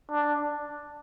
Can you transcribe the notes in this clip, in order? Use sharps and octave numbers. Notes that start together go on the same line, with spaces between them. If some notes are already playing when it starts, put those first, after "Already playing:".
D4